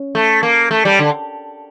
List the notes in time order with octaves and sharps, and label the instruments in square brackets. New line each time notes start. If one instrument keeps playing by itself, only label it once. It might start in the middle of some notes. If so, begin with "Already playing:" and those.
Already playing: [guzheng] C#4
[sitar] A3
A#3
A3
G3
D3